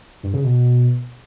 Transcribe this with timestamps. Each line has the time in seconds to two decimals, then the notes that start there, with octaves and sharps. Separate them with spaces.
0.23 G2
0.34 C#3
0.44 B2